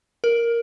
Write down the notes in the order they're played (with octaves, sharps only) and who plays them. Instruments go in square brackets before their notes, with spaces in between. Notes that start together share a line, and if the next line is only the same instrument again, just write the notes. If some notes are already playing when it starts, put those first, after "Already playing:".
[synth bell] A#4